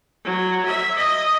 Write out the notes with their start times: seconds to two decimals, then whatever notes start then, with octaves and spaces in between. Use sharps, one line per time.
0.24 F#3
0.65 E5
0.96 D#5